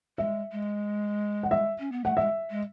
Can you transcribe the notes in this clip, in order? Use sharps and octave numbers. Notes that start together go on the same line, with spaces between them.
G#3 E5
G#3
F#5
E5
C#4
B3
A3 F#5
G#3 E5
G#3